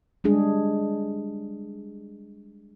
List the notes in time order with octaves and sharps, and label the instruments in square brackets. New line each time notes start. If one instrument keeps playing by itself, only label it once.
[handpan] G3 G#3 D4 G#4